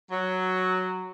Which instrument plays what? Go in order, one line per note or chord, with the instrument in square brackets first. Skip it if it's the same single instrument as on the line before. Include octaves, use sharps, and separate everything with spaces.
[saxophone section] F#3